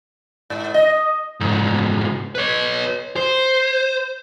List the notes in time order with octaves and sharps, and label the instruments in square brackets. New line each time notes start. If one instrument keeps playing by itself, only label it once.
[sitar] G#2
D#5
[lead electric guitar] C2 G#2
B4 C#5
C5